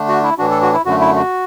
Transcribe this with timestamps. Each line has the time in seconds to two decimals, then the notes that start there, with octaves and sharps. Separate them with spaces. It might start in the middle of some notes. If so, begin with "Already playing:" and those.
Already playing: D3 A3 D4
0.08 F#4
0.23 E4
0.38 A2 E3 D4 F#4
0.51 A4
0.62 F#4
0.74 E4
0.85 F#2 D3 A3 F#4
1.00 E4
1.16 F#4